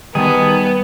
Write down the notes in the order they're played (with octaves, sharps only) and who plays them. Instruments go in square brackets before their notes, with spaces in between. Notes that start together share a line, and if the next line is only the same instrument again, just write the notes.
[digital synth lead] D#3 [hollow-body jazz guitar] G3 A5 [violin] B3 [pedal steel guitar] G#4